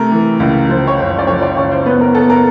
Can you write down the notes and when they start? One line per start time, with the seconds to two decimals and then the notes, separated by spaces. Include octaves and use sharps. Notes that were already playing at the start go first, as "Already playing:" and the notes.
Already playing: C3 A3 A#4
0.11 E3
0.40 C#2
0.69 F3 C5
0.87 C#5
0.98 F#1 C5
1.18 D5
1.27 F3 C#5
1.42 D5
1.56 F#1 C#5
1.72 C5
1.86 B3 B4
2.01 A#4
2.15 B3 A4
2.30 A#4